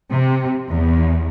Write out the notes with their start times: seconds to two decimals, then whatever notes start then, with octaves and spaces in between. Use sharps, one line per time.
0.11 C3
0.70 E2